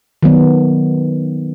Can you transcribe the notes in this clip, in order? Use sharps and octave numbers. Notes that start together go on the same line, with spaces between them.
D#3 F#3 B3